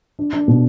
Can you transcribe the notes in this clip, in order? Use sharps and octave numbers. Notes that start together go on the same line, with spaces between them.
D4
D4
B2